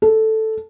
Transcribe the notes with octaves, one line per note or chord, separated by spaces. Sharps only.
A4